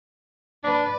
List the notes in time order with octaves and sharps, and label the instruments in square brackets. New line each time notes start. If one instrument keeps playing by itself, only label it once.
[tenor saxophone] D4 [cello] B4 D5